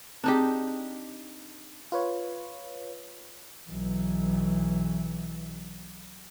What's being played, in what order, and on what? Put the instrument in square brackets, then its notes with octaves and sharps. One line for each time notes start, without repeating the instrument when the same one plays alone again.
[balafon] C4 G#4 [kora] D4 D#4 G4
[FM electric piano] F4 B4 C#5
[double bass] B1 E3